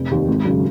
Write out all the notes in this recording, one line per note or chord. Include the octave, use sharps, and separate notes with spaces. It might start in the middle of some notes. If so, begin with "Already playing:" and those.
Already playing: F1
D#2 D#3
G#1
F#2 C#3